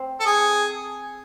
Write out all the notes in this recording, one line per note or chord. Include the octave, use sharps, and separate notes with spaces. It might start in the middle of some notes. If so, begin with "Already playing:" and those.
Already playing: C4
A4
G#4